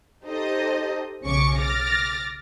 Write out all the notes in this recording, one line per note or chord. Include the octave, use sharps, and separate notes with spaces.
D#4 G4 A4 C5 D#5
B1 C#3 C#4 C#6 D6 C#7
D6 F6 A6 A#6